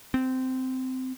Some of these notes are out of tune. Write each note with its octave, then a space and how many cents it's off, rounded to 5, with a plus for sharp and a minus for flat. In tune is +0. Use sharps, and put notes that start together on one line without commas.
C4 -15